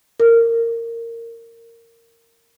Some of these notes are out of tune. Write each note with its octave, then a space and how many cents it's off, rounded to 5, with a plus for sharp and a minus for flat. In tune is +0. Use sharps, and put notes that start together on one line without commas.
A#4 -15